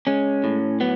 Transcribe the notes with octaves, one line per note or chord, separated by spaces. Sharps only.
G#3 C#4
A2
F#3 B3